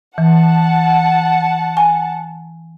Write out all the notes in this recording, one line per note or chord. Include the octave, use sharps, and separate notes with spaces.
E3 F#5 A5
G#5